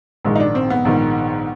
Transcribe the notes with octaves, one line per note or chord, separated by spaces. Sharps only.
A#1 G#2 D#3 G#3
D#4
D4
C4
B3
A#1 G#2 D#3